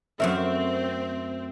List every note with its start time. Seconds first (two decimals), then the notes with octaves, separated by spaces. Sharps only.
0.20 F#2 A3 C4 A#4 E5